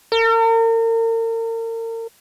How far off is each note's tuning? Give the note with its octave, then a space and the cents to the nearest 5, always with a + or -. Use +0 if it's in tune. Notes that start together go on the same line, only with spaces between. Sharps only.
A#4 -40